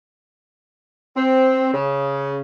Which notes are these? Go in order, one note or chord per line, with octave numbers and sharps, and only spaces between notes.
C4
C#3